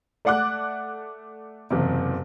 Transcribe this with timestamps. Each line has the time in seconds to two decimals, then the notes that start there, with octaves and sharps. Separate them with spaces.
0.25 A3 D5 F#5 D6 F#6
1.70 F#1 E2 C3